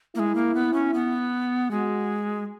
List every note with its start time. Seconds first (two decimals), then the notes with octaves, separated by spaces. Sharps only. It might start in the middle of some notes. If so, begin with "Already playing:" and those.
0.15 G#3 A#3 E4
0.35 A#3
0.55 B3
0.73 C#4
0.94 B3
1.71 G#3 F#4